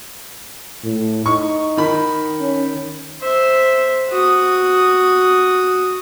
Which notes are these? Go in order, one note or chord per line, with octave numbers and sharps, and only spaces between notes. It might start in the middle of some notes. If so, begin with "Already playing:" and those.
A2
D#4 C#6
D#3 B5
C#4
C5 E5
F#4 D#6